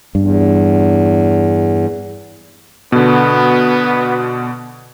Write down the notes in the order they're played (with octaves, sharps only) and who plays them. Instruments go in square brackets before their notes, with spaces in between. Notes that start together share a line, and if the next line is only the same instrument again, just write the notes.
[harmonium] E2 [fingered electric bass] G2
[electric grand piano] B2 D3 [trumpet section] B3